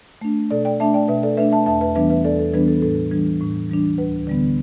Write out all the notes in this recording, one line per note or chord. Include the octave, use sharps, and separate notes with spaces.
A3 D4
B2 A4 D5
D5 G5
A3 D4 E5 A5
D5 G5
B2 B4 E5
A4 D5
A3 D4 B4 E5
E5 A5
E2 E5 A5
B4 E5
E3 G3 B3 D4 B4 E5
B4 E5
E2 A4 D5
A4
E3 G3 B3 D4 B4
A4
A2 A4
E3 G3 D4
A2
E3 G3 D4
D2 B4
D3 G3 B3